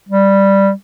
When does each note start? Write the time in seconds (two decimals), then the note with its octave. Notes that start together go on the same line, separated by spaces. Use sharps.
0.09 G3